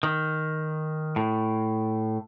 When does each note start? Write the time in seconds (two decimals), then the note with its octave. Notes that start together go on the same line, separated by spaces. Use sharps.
0.03 D#3
1.16 A2